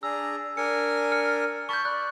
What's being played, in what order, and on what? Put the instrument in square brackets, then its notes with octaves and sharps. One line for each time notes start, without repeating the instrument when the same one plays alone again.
[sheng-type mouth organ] D4 G#4 A#5 [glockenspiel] E6
[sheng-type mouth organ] D4 A#4 G#5 [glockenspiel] C#7
[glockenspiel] F6 C#7
[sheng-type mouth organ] A5 B5 [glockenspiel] C#6 G6
[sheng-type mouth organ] D5 [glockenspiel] F#6